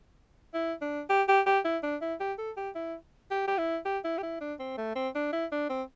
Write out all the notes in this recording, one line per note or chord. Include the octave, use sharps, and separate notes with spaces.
E4
D4
G4
G4
G4
E4
D4
E4
G4
A4
G4
E4
G4
G4
E4
G4
E4
G4
E4
D4
C4
A3
C4
D4
E4
D4
C4